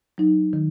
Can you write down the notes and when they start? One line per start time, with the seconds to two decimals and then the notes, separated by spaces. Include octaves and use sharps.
0.18 F#3 D#4
0.53 D#3